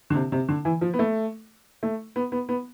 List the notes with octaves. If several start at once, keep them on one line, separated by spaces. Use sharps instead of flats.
D3
C3
C3
D3
E3
F3
B3
A3
A3
B3
B3
B3